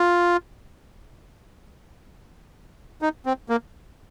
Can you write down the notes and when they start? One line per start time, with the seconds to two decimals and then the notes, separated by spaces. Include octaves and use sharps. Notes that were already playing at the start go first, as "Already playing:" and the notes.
Already playing: F4
3.02 D#4
3.26 C4
3.49 A#3